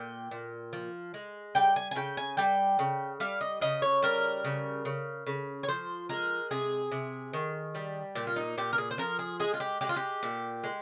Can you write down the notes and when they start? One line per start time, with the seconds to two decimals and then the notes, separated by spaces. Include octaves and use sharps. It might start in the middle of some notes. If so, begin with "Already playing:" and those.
Already playing: A#2 G5
0.31 A#2
0.73 F3
1.14 G#3
1.55 G3 G5
1.76 G#5
1.91 G#5
1.96 C#3 G5
2.17 G#5
2.37 G3 G5
2.79 C#3
3.20 G3 F5
3.41 D#5
3.61 C#3 D#5
3.82 C#5
4.02 G3 A#4
4.44 C#3
4.85 C#3
5.27 C#3
5.63 C#5
5.68 F3 C5
6.09 G#3 A#4
6.51 C3 G#4
6.91 C3
7.33 D#3
7.75 G3
8.15 A#2 G4
8.27 F4
8.36 D#4
8.58 A#2 G4
8.73 A#4
8.78 G#4
8.91 C5
8.98 F3 A#4
9.19 G#4
9.40 G#3 G#4
9.54 F4
9.60 G4
9.81 G#3 G4
9.89 F4
9.96 G4
10.23 A#2
10.64 G#3